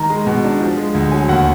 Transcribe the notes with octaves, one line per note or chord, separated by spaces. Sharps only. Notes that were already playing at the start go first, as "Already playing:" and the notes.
Already playing: D#3 A#5
G#3
B2
D4
F3
G#3
D2
F#3 G#5
D#2 F#5